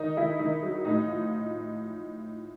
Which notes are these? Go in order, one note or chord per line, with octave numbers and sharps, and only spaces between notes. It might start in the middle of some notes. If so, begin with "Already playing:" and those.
Already playing: D#3 D#4
D#3 E4
D#3 D#4
F#3
A2 D#4
F3